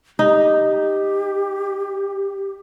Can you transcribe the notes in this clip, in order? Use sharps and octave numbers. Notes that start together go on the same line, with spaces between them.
D#4 G4